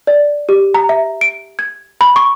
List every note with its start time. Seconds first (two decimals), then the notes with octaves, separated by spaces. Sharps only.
0.07 D5
0.49 G4
0.74 A#5
0.89 E5
1.21 D7
1.59 G#6
2.01 B5
2.16 C#6